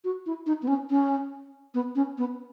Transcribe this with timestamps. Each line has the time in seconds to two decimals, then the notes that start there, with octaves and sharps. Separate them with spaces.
0.04 F#4
0.26 E4
0.46 D#4
0.63 B3
0.68 C#4
0.90 C#4
1.74 B3
1.95 C#4
2.18 B3